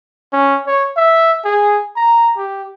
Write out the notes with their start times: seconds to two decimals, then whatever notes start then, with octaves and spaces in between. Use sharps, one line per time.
0.33 C#4
0.67 C#5
0.97 E5
1.45 G#4
1.96 A#5
2.37 G4